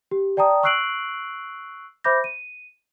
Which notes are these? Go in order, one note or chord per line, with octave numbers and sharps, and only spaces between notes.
G4
D5 G5 A5 A#5 D#6
C#6 E6 F#6 C7 D7 F#7
C5 E5 B5 D6 G6 A#6
D#7